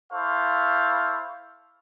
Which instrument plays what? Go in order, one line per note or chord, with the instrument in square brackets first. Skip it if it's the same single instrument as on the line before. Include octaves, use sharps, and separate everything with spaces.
[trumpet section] E4 A4 C5 F5 C#6